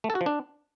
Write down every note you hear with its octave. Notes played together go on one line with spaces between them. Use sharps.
A3
A4
F#4
F3
D4